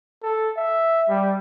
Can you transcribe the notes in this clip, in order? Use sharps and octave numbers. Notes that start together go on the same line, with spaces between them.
A4
E5
G3